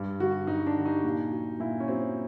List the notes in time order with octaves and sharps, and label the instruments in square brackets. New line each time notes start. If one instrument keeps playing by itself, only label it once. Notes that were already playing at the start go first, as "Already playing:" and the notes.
Already playing: [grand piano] G2
D3 G3 F#4
G2 D#4
D4
D3 G3
D#4
A#2
F#3
A#2 E4
C#4
F#3 C4